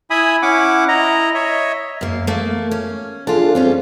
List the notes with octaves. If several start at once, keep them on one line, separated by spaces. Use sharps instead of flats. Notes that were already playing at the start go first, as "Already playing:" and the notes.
E4 E5 G#5 B5 D#6
C#4 E4 F#5 D6
E4 D#5 A#5
C#5 D#5 E5
F#2 A#3
A3 A#3
C#4
D4 F4 G#4 A4
G3 C4 C#4 F4